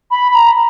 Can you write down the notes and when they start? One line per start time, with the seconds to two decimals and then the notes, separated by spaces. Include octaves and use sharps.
0.11 B5
0.34 A#5